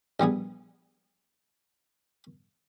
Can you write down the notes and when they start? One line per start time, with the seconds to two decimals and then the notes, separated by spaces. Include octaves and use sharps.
0.20 A#1 G3 B3 G#4